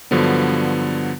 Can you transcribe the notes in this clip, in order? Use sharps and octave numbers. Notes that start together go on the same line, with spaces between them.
G2 D3 F3 F#3 B3